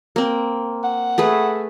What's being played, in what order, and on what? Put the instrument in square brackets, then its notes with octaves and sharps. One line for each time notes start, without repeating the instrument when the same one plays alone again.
[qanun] A#3 C4
[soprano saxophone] F#5
[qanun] A3 G#4 B4